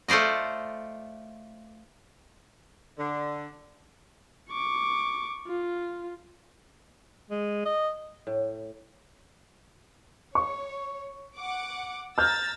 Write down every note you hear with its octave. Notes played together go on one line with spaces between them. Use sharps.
A3 F4 C5 D5 D#5
D3
C#6 D6
F4
G#3
D#5
A2
C#5 C#6
F#5 D6
A#5 E6 F6 G6 A6